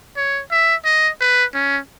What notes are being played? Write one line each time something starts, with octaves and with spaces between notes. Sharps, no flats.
C#5
E5
D#5
B4
C#4